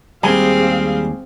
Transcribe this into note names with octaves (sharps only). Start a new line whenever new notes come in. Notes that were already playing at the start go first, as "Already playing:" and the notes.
D#2 G3 G#3 C4 G4 G#4 F5 G#5